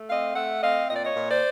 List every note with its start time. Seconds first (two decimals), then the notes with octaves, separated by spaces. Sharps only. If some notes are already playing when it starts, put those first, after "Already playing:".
Already playing: A3
0.08 C4 D#5 F5
0.35 A3 E5 F#5
0.62 C4 D#5 F5
0.89 A#2 D#5
0.96 D5
1.03 C#5 D#5
1.16 A#2
1.29 C5 D5